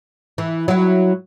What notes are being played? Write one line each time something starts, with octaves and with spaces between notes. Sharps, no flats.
E3
F#3 E4